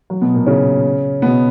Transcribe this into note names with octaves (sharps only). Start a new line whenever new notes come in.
F#3
B2 B3
A#2 A#3
C#3 C#4
B2 B3